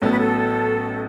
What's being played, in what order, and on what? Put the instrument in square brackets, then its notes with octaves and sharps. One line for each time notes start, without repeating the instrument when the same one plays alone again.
[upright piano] A1 A2 F#3 B3 [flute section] A4
[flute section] B4
A4